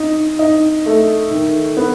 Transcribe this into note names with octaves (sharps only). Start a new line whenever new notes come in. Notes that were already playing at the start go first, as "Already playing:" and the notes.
Already playing: D#4
D#4
A3
D#3
B3